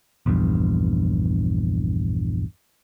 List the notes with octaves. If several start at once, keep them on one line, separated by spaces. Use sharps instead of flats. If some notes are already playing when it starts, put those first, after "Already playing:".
A#1 E2 G2